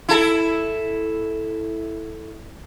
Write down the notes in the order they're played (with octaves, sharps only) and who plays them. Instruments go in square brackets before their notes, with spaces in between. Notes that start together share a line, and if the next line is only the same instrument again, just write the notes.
[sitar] E4 A4